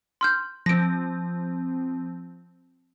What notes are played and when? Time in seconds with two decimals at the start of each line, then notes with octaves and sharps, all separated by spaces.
0.21 C6 F6 G6
0.66 F3 C4 A#6 D7